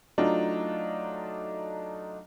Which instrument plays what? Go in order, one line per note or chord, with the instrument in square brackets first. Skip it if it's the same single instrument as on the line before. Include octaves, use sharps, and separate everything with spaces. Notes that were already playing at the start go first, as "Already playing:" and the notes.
[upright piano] F#3 A3 D4 D#4 F4